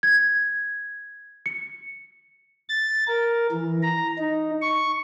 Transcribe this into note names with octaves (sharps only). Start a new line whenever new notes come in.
G#6
C#7
A6
A#4
E3
A#5
D#4
C#6